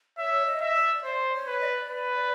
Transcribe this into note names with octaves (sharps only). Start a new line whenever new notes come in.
C#5 E5
D#5
E5
D5
C5 D5
C#5
B4
D#5
D5
B4